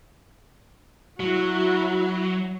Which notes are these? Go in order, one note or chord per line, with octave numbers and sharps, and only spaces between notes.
F#3 E4 F#4